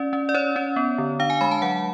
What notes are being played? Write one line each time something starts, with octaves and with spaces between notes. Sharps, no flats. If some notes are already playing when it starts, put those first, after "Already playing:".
Already playing: C#4 D5
C#4
D5
C#4 C#5
C#4
B3
D3
D4 F5
G#5
G#3 B5
A5
F#3 F#5